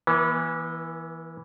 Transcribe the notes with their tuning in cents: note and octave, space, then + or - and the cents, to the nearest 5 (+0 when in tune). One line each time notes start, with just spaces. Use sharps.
E3 +0 B3 -45